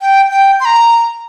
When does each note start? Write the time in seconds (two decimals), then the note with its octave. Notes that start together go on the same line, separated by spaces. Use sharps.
0.01 G5
0.31 G5
0.60 C6
0.65 A#5